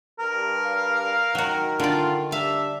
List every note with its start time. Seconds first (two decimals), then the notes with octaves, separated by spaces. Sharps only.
0.19 G2 A#4
0.65 F5
1.35 D#3 F#3 F#4
1.80 D3 F4 D5
2.32 G3 D4 E5 F5